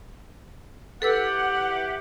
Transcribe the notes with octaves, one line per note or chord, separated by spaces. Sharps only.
E3 G4 A4 B4 F#5 E6